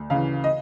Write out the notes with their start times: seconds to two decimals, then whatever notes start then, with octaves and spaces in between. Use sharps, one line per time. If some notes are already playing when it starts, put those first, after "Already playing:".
Already playing: D2
0.10 C#3 E3 F5
0.44 D#5